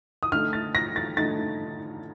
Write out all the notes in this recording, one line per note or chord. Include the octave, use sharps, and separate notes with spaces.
D#6
D3 A3 D#4 F6
A6
A#6
A6
D3 A3 D#4 A6